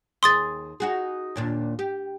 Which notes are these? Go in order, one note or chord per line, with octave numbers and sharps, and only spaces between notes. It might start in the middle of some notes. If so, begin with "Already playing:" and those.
D#2 G#4 C6 D#6 A6
D#4 F#4 G#4
D#2 A#2 D4
G4